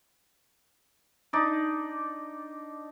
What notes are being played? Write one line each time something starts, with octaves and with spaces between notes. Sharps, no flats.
D4 D#4 D5